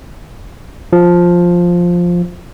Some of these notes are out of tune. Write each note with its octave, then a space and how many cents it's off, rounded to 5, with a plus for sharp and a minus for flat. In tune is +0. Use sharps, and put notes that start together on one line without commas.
F3 +5